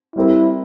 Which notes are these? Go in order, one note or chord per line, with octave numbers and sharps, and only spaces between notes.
G3 C4 E4 G4 A#4